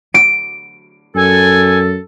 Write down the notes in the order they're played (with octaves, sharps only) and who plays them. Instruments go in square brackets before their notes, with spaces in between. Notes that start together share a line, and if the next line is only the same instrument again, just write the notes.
[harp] D7
[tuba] F#2 [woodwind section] A4 [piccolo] G#5